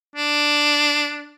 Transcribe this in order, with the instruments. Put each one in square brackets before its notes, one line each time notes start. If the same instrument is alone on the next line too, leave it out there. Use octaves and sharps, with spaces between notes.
[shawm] D4